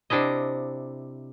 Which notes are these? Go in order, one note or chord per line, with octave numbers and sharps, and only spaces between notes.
C3 D4 E4 D#5